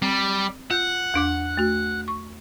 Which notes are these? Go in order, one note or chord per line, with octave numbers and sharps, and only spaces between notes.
G3 C4
F4 F#5 G6
E2 D4 D6
A3 F#4
C#6